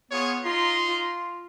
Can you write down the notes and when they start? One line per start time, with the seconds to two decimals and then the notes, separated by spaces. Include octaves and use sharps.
0.11 B3 F4 G#4 C#5
0.44 D#4 F4 A#5 C6
0.88 F4